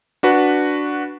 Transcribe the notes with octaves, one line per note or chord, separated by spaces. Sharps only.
D4 F#4 B4